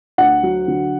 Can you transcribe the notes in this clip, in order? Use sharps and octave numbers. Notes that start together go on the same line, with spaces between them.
D2 F#5
F#3
D3